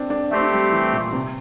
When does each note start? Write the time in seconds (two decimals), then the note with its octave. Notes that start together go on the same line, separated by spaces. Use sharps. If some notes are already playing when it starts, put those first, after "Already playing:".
Already playing: C4 D4
0.10 D4
0.31 A3 C4 D4 G4 C5
0.41 D4
0.52 G3
0.72 E3
0.93 A#2
1.13 C3